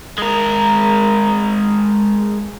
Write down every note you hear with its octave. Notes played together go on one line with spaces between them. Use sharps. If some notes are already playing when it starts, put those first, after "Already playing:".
G#3 A#4